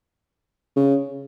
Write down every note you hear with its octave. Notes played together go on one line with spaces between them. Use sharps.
C#3